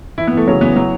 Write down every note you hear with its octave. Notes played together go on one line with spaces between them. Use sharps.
E3 E4
B3
E3 A3
C#3 F#3
E2 B3
E3 F#3